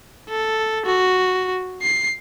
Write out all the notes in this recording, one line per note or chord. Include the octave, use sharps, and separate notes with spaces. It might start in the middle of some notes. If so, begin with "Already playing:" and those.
A4
F#4
C7